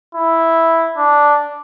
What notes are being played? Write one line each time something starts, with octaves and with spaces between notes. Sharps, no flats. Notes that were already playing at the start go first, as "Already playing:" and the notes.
E4
D4